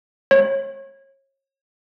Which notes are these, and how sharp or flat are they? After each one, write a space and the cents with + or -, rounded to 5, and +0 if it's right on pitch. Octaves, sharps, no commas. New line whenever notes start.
C#5 -35